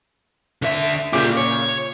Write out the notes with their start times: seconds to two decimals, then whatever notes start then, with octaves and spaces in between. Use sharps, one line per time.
0.62 D3 E5
1.13 A#2 C#3 F4 G4 D6
1.37 C#5